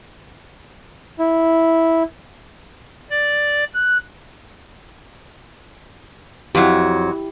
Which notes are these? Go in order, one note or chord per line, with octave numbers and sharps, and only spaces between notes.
E4
D5
F#6
F2 F#3 E4 G4